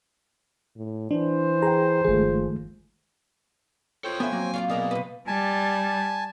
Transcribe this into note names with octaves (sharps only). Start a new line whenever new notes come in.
A2
E3 D4 C5
G#4 G5 A#5
G1 D#3 F3 G#3 A3 G#4
F4 A4 C5 C#5 G5
F3 B3 A4 E5 G#5
F#3 A#3 C4
F4 C#5 D5
B2 E4 G#4 A#4 D5 D#5 F5
C3 B4
G3 G#5 A5